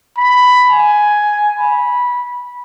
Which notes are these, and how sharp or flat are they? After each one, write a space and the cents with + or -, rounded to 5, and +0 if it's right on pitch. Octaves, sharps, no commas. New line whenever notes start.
B5 +10
G#5 +5
B5 -15